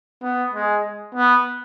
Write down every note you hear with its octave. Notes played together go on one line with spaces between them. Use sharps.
B3
G#3
B3